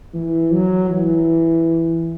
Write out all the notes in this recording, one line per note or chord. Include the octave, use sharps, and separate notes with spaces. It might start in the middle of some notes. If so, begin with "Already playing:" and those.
E3
F#3
E3